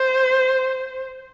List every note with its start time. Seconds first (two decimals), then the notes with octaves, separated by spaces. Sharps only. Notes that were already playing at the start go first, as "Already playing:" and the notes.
Already playing: C5